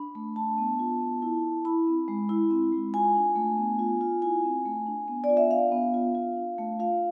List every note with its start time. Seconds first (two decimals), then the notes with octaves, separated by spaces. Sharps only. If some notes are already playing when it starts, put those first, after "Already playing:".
Already playing: D4 B5
0.15 A3
0.36 D4 A5
0.58 B3
0.79 F4
1.00 B3
1.22 E4
1.43 E4
1.65 E4 B5
1.87 C4
2.08 G#3
2.29 E4
2.51 C4
2.72 G#3
2.94 F4 G#5
3.16 D4
3.36 A3
3.58 B3
3.79 F4
4.01 F4
4.22 E4 G#5
4.44 C4
4.65 A3
4.87 D4
5.08 B3
5.24 D5
5.29 F4
5.37 E5
5.51 D4 F5
5.72 B3
5.94 F4
6.15 F4
6.36 D4
6.58 A3
6.79 F4 F5